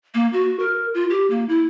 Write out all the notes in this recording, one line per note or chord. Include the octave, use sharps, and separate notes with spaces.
A#3
F#4
A#4
F4
G4
A#3
E4